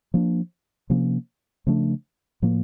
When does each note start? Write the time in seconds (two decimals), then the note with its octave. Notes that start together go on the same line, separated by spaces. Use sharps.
0.14 F3 A#3 D4
0.90 C3 F3 A#3 C#4
1.67 C#3 F3 A3 D4
2.42 A2 F3 A#3